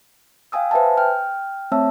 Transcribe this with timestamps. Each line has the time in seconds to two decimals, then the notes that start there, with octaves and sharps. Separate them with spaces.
0.52 F5 G5 G#5 D#6 E6
0.71 B4 C5 E5 G#5 A5
0.97 G5 F6
1.72 A3 C4 C#5 E5 A5 E6